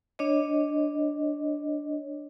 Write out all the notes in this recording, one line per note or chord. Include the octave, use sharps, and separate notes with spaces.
D4 C#5 D#5